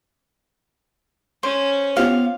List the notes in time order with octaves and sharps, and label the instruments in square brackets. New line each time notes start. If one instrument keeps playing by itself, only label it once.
[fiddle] C#4 [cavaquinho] C5
[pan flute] B3 [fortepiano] F4 G4 C5 [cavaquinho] F5